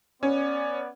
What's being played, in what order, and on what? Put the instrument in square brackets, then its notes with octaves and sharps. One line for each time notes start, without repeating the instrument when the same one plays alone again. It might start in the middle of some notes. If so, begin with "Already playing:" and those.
[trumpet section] B3 D5 [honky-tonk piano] C#4